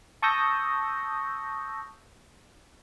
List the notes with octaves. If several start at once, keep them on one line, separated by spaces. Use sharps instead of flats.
A5 C#6 D#6 E6 G6 A#6